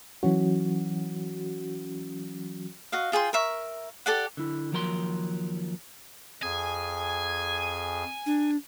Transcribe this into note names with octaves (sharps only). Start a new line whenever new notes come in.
E3 F#3 C#4 F#4
F#4 D#5 F5
F4 G#4 G5 C6
A#4 E5 C#6
G4 A4 D5 F#5
D3 E4
D#2 F3 F#3 A#4 A#5 C6
F2 G#4 G#5
D4